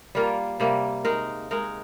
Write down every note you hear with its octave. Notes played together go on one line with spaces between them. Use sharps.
G3 A#3 F4 A#4
C3 G3 A#3
G#3 D#4 A#4
G#3 D#4 A#4